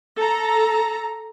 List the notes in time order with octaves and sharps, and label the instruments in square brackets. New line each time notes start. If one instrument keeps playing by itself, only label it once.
[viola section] A4 A#5